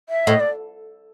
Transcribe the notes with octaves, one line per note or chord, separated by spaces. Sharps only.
E5
A2 D#5
D5